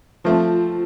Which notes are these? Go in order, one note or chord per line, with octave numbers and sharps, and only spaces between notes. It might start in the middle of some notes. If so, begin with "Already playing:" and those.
F3 A3 C4 F4